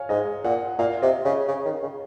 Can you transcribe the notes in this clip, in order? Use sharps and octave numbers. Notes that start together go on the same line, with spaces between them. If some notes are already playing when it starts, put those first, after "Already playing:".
Already playing: C#5 F5 G#5
G#2 D#5
A#2 F#5
A#2 F5
C3 D#5
C#3 D#5
C#3
D#3
C#3